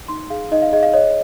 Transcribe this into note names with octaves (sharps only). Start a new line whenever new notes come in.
D#4 C6
G#4 F5
D#4 D#5
F5
G#4 D#5
F5
C#5 D#5